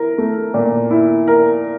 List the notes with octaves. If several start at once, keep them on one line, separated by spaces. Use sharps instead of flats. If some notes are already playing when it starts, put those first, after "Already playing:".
Already playing: E4 A#4
A3
A#2
E4
A#4